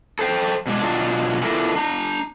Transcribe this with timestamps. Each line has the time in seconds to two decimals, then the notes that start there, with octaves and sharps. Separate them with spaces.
0.19 A4 C5 G5
0.67 B2 G#3 D4
0.82 B2 F#3 D4 F4 D5
1.43 B3 D4 E4 F4 A4 A#4
1.75 D4 A#5